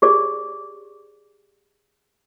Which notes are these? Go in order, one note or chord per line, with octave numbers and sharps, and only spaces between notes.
G4 G#4 D5